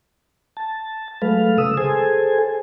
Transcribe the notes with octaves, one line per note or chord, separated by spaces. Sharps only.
A5
F#3 G#3 A3 A4 B4 F5
C#3 D#6 E6
G#4 A4 C5 G#5